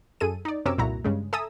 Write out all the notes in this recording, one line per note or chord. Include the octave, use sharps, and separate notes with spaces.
F#2 G#4 A4 D#7
D#4 D5
F#2 C3 C#4 A#4 D6 E6
C2 F2 A#2 E4 F#4 A#5
G2 C#3 G#3
A4 E5 G#5 A#5 D#6 E6